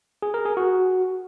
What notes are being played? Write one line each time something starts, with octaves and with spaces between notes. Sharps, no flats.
G#4
A#4
G#4
F#4